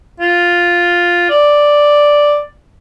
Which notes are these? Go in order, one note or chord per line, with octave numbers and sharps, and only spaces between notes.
F4
D5